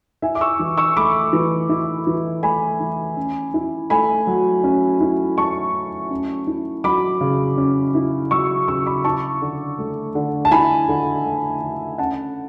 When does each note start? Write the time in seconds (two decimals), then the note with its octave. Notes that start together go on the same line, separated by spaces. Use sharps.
0.22 E4 E5 G#5
0.35 D6
0.41 C#6 E6
0.59 E3
0.78 C#6 E6
0.97 A3 B5 D6
1.33 E3
1.69 E4
2.07 E3
2.43 A3 G#5 B5
2.80 E3
3.17 C#4
3.54 E4
3.90 A3 G#5 B5
4.27 F#3
4.64 C#4
5.01 E4
5.37 A3 A5 C#6
5.74 F#3
6.10 C#4
6.47 E4
6.84 F#3 B5 D6
7.21 C#3
7.57 C#4
7.95 E4
8.31 F#3 C#6 E6
8.68 C#3 C#6 E6
8.86 B5 D6
9.04 E4 A5 C#6
9.42 D3
9.79 A3
10.15 D3
10.45 A5
10.51 E4 G#5 B5
10.89 D3
11.25 A3
11.62 D3
11.98 C#4 F#5 A5